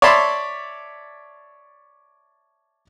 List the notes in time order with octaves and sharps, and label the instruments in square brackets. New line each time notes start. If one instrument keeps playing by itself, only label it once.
[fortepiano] C#5 D5 E5 A5 B5 C6